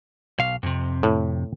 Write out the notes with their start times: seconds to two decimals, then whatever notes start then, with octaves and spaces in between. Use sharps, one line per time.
0.39 B1 F5
0.63 F2 C3
1.03 A2